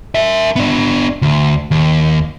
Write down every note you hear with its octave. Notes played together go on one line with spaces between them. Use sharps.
A#4 E5
B3 D4
D2
D#2